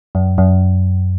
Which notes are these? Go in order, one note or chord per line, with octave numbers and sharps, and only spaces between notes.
F#2
F#2